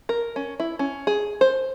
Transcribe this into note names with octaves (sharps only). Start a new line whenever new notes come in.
A#4
C#4
E4
C#4
G#4
C5